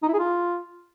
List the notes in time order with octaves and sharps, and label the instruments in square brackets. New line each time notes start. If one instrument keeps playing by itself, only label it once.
[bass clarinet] D#4
E4
G#4
F4